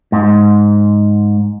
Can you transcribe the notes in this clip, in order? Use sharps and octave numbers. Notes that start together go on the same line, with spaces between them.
G#2